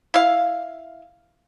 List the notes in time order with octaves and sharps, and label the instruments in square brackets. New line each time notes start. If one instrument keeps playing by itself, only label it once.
[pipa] E4 F5